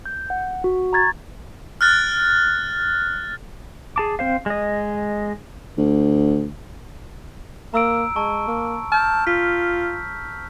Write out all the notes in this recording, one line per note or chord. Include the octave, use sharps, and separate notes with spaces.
G6
F#5
F#4
A#5 C#6 G#6 A6
F6 F#6 A6
G#4 A5 D6
C4 C5 F5
G#3 D#5
D2
A#3 A#5 E6 D7
G#3 A5 C#6
A#3
A5 F6 G6
F4 B6